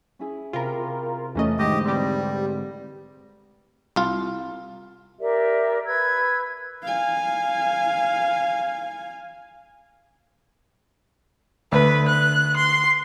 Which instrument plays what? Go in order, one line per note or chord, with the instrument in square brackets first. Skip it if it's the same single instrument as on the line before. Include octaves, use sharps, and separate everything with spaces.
[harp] C#4 E4 G#4
[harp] C3 C5 B5 [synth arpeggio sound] F4 A#4
[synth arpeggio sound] E2 C#4 D#5 [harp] E3 A3 A4
[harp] G#2 D3 [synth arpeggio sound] D#3 [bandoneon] G4 D#5
[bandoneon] G3 [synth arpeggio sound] C4 G4 [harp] B4
[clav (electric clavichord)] C2 F4
[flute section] G4 A#4 D5 E5
B4 E6 G#6
[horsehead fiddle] F5 G#5
[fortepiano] D2 [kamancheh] B4
[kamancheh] F#6
C6